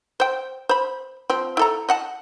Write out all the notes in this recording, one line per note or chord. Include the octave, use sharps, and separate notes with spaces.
C5 G5
C5 B5
F3 C4
E4 A4 A#5
D#5 F#5 A5